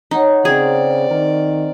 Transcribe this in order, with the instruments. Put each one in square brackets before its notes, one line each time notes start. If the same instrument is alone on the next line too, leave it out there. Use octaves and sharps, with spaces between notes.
[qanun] D#4 [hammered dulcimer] C#5 F#5
[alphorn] C#3 [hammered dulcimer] C4 A#4 [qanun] G#4 [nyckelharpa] D5
[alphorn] D#3 [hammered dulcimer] A#4